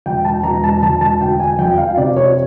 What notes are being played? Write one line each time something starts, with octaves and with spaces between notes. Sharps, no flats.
E1 G5
A5
E1 A#5
A5
E1 A5
A5
D2 G5
G#5
F2 G5
F5
C3 D5
C#5